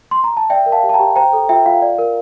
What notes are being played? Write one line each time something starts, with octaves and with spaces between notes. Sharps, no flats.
C6
A#5
A5
D5 E5 G5
A#4
F5 A5
G4
A5
G5 A#5
G4
C5 G5 A#5
A4
F4 E5 G5
F4 F5
D5
A#4